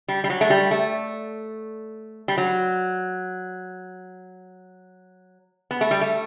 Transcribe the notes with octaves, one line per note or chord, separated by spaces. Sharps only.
G3
G3
F#3
A3
G3
A3
G3
F#3
B3
A3
G3
A3